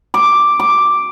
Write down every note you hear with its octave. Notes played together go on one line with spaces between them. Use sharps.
D6
D6